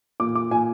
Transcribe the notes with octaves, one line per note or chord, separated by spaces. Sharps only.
A#2 D6
D6
A#2 G#5